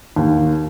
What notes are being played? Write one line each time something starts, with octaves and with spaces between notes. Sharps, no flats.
D#2